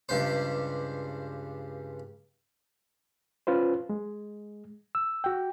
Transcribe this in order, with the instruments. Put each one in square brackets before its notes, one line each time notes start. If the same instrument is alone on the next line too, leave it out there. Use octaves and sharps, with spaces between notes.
[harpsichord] C#2 G2 C5
[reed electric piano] C#4 F4 B4 C5
G#3
E6
F#4 G5